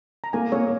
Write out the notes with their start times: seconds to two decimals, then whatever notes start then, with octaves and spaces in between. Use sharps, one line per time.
0.24 A#5
0.33 A#3 G#5
0.52 A#3 C#5